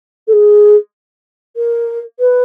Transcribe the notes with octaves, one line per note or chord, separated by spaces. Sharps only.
A4
G#4
A#4
B4